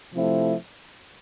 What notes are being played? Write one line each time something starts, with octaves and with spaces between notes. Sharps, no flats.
C3 F3 A3 C4 E4